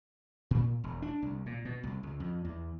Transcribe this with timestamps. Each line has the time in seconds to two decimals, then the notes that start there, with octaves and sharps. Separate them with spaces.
0.51 A#2
0.84 E1
1.02 D4
1.22 C2
1.46 A#2
1.65 B2
1.83 C2
2.03 C#2
2.20 F2
2.45 E2